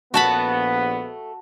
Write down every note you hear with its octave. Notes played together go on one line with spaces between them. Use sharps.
A#1 A3 B3 F#4 A5 B5